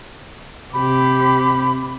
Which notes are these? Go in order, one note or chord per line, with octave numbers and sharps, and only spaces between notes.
C3 G4 B5